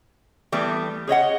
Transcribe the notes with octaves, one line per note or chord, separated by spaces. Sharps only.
E3 G3 A3 B3
G#4 C#5 D#5 F#5